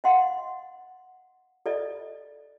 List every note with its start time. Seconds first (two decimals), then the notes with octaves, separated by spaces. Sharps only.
0.04 D#5 F5 F#5 C6
1.66 A4 D5 D#5